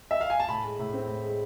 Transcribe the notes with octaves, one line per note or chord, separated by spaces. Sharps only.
E5
F5
G#5
A5
A2 B5
G#3
A2
C4
A2
G#3